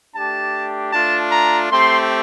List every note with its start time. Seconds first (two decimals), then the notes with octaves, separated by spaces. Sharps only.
0.15 A3 D4 G4 A5
0.92 A3 D4 F4 A5
1.32 A#5
1.70 A3 C4 G4 C6